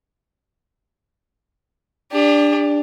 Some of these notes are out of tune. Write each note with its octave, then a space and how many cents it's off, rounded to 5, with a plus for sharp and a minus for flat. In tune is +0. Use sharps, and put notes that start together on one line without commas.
D4 +0 G4 +40